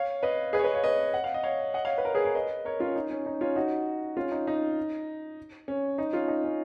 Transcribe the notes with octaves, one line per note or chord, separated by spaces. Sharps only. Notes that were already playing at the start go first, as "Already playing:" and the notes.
Already playing: C#5 F5
B4 D#5
G#4 B4
C#5
B4 D#5
C#5 F5
B4 D#5
F#5
F5
D#5
C#5 F5
D#5 F#5
C#5 F5
B4
A#4 C#5
G#4 B4
A#4 C#5
B4 D#5
A#4 C#5
C#4 F4
D#4
C#4
D#4
C#4 F4
D#4 F#4
C#4 F4
D#4
D#4
C#4
D#4
C#4 F4
D#4
C#4